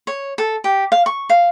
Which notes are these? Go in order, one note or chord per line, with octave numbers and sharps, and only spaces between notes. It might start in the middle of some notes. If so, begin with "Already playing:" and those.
C#5
A4
G4
F5
C#6
F5